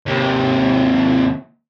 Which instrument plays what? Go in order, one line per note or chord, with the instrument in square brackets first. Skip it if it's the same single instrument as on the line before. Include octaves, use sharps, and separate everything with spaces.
[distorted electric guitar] D#2 C3